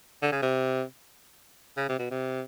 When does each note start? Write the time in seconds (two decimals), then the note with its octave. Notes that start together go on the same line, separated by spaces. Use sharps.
0.22 D3
0.32 C#3
0.42 C3
1.77 C#3
1.89 C3
1.99 B2
2.11 C3